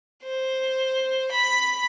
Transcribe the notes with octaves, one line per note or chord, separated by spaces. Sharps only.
C5
B5